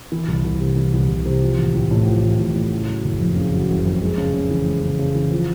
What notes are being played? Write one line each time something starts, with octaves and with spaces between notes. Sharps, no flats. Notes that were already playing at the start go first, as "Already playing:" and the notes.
E3
C2
C2
C3
E3
C2
C2
C3
F3
A1
A1
A2
F3
A1
A1
A2
C#3
F#3
F#1
F2
C#3
F#3
F#1
F2
G#3
C#3
C#3
E3
G#3
C#3
C#3
E3
F3